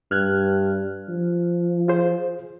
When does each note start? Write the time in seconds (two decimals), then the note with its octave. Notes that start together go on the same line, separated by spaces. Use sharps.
0.11 G2 F6 F#6 G#6
1.08 F3
1.88 F4 G#4 C5